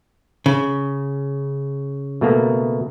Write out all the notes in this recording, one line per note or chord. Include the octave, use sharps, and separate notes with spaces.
C#3
B2 A3 A#3